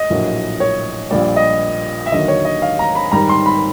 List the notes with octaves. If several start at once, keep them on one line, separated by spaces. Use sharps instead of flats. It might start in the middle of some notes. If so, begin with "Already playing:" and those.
Already playing: D#5
A#1 A2 F#3 A#3
C#5
A#1 A#2 G3 D5
D#5
E5
D#2 D3 F#3 A#3 D#5
C#5
D#5
F5
A#5
B5
G#2 D#3 G3 A#5
C6
B5